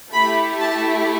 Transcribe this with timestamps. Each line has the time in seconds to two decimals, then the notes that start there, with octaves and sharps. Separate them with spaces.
0.13 A3 E4 G4 B5
0.60 A5